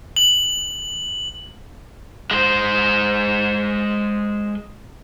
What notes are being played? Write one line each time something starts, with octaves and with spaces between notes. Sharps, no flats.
F#7
G#3 C5